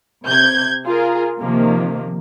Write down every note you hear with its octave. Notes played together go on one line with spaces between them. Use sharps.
C3 G6 G#6
F4 G#4 A#4
C3 D#3 F3 A#3